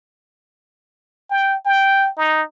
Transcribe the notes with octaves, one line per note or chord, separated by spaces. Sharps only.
G5
G5
D#4